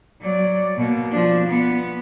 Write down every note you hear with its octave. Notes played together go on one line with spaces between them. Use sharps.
F#3 D5
B2 A#3
F3 D4
B3